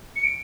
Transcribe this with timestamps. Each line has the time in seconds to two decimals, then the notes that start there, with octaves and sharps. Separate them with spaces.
0.16 C#7
0.23 D7